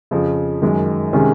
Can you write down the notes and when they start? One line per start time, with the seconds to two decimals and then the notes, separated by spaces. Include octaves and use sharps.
0.11 F2 C#3 F3
0.62 F#2 D#3 G#3
1.13 C3 D#3 G#3 C#4 G#4